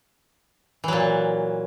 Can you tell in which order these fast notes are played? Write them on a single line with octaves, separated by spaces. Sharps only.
E3 F#3 A#2